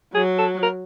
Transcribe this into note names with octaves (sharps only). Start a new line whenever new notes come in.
F#3 G#4
A4
A#4